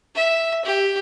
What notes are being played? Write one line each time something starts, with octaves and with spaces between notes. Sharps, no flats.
E5
G4